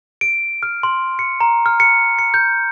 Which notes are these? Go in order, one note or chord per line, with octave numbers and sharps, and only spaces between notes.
D7
F6
C6
C#7
A#5
F6
C#7
C#7
G6